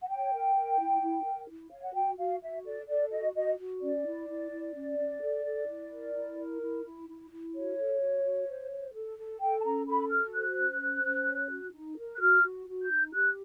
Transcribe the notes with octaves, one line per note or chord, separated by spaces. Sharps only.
F#5
C#5 G5
A#4
A#4
E4
E4
A#4
E4
C#5 F5
F#5
F#4 G5
F#4 F5
F#4 E5
A4 D5
A4 D5
F#4 D#5
F#4 D#5
F#4
C#4 D5
E4
E4
E4
C#4
C#4
A4
A4
E4
A#4
E4
A#4
E4
E4
E4
E4
F#4 C#5
A4
F#4
F#4
C5
C5
A4
A4
A4 G5
A5
C#4 A#5
A4 B5
F#4 F6
C5 F#6
C#4
C5
C#4
C#5
F#4
D#4
A#4
F#6
F#4 F6
F#4
F#4
G6
D#4
G4 F#6